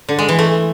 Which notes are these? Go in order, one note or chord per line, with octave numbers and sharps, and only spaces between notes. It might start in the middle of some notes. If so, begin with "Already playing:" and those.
D3
G#3
E3
A3